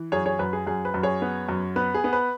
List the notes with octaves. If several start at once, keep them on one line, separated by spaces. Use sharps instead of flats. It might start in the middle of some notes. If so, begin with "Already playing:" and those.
Already playing: E3
F#2 G#4 C#5
G#4 C#5
F#2 B4
G#4
F#2 G#4
B4
F#2
G#4 C#5
B3
F#2
B3 B4
G#4
B3
B4